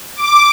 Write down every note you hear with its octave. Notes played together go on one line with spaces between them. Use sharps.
D6